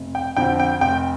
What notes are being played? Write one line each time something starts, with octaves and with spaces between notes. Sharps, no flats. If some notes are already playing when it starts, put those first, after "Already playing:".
Already playing: F1
G5
F2 D3 G5
G5
F1 G5